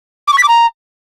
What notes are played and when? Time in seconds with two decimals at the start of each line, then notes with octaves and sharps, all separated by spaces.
0.28 D6
0.33 C#6
0.38 B6
0.43 D6
0.48 A#5